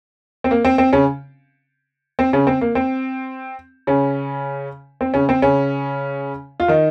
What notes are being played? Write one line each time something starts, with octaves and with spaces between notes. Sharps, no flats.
C4
A#3
C4
C4
C#3 C#4
C4
C#3 C#4
C4
A#3
C4
C#3 C#4
C4
C#3 C#4
C4
C#3 C#4
F4
D#3 D#4